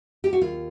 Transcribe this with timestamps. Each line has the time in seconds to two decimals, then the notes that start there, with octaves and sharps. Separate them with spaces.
0.24 G4
0.33 F#4
0.41 D#2 F4